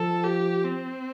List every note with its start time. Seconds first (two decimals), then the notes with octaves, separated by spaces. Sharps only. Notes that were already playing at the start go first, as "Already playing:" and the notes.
Already playing: F3 A4
0.24 G4
0.65 C4